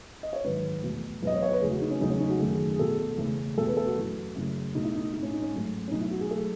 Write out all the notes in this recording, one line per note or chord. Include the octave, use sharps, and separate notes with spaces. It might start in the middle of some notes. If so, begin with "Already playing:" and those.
D#5
C#5
G#2 D#3 F#3 B4
E2 B2 A3
E2 B2 F#3 B4 D#5
C#5
C#5
B4
E2 C#3 E3 A3 G#4
F#4
D#4
C#4
E2 C#3 F#3 A3 D#4
C#4
D#4
F#4
F#2 D#3 A3 G#4
G#4
B2 A3 A4
E2 C#3 E3 A3
E2 B2 A3 A4
B4
A4
F#4
F#2 E3 A3
F#2 C#3 E3 A3
B2 A3 D#4
E4
D#4
A2 G#3 D#4
C#4
D#4
C#4
G#2 F#3 A3
C#4
B2 F#3 A3 D#4
E4
F#4
G#4
F#3 A3 A4